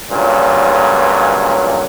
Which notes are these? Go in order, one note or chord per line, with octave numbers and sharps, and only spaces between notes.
C#2 G2 A#2 F#3